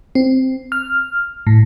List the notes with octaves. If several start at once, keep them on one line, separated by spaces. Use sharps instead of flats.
C4
F6
A2